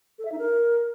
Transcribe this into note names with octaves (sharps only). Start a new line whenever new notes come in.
A4
E5
D#4
A#4